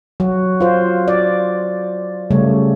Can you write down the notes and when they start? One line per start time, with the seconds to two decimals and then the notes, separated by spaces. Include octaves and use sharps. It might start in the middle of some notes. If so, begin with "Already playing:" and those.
0.20 F#3 F#4
0.61 F4 C5
1.08 D5
2.31 C#3 G3 A3 C#5